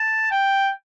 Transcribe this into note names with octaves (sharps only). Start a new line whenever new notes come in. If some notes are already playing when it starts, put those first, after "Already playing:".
Already playing: A5
G5